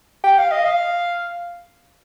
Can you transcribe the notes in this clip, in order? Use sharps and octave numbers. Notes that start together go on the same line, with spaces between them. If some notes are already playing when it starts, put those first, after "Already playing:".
G5
F5
D#5
F5